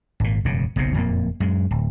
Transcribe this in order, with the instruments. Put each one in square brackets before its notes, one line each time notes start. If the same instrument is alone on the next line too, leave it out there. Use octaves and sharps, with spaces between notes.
[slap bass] G#1 A#2
E1 F#2 C#3
F#1 B1 F#2 C3
F#1 F2 A#2 A#3
F#2 G#3
D1